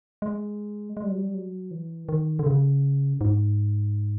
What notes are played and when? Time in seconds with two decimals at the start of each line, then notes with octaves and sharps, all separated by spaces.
0.22 G#3
0.97 G#3
1.04 G3
1.11 F#3
1.17 G3
1.34 F#3
1.71 E3
2.09 D#3
2.39 D3
2.46 C#3
3.21 G#2